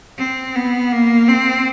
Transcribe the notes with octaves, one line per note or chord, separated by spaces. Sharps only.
C4
B3
A#3
C4